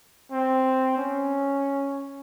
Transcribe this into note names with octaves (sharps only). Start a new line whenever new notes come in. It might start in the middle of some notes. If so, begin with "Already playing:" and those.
C4
C#4